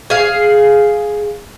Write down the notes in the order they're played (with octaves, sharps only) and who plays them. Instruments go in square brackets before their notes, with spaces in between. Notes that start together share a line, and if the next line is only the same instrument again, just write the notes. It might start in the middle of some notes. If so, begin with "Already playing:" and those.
[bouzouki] G#4 F5